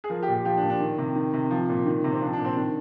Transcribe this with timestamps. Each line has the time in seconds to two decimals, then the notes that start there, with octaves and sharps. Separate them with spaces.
0.04 G#4
0.10 F3 A#4
0.23 G4
0.28 A#2
0.34 G4
0.45 F3 G4
0.57 D4
0.63 A#2
0.70 D4
0.80 D#3
0.98 C3
1.16 D#3
1.33 C3
1.51 F3
1.69 A#2
1.86 D#3
2.04 C3
2.12 C4
2.21 F3 D4
2.33 D4
2.39 A#2
2.45 C4
2.57 D#3 D4